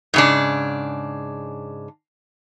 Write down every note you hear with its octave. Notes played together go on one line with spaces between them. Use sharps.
G#2 C#3 D4